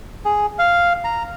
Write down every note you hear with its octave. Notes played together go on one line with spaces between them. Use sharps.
G#4
F5
A#5